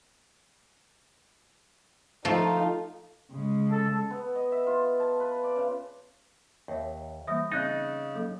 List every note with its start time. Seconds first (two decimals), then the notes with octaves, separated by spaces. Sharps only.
2.25 F3 A3 D#4 F4
3.33 C#3 G#3
3.71 A4
4.10 B3
4.35 D#5
4.52 E5
4.67 F4
5.00 A5
5.20 B4
5.44 D5
5.56 C#3
6.68 D#2 C#5 E5
7.27 E3 G3 A#3 E5 D#6 A#6
7.52 C#3 C4 D#4 D#5 F#6 A6
8.15 F#3 A#3 A4